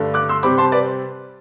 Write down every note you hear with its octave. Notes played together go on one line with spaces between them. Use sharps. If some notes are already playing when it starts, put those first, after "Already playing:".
Already playing: G2 D3 A3 D4
D6 F#6
C6 E6
C3 G3 C4 B5 D6
A5 C6
B4 D5